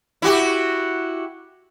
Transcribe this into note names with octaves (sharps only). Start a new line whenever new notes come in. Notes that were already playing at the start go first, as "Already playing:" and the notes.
E4 F#4 G4